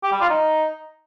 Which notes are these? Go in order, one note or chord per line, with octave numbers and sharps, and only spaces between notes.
G4
G3
F4
D#4